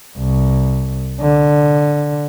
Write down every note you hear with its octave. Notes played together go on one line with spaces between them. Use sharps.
C2
D3